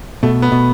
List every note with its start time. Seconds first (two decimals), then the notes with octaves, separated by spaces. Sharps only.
0.23 B2 A3
0.42 B3
0.52 B2